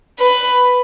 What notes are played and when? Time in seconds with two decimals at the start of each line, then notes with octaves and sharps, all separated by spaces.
0.19 B4